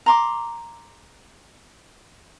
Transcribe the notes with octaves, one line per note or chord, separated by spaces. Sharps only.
A#5 C6 D6